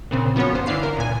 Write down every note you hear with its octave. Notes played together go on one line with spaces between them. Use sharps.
A#2 C#3 C4
F3 B3 C#4 F#4 C#5
G1 C5
D3 E3 D4 F5 C7
A#4
C#2 A#2 G#5